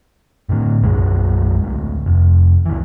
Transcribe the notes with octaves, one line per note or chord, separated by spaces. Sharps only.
A2 D3
B1 F#2 G#3
D1 D2
F1
C#2 E3